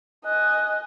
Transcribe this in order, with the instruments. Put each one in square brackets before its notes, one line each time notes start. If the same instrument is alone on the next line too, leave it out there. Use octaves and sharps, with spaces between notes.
[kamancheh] D#5 G#5 [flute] F#6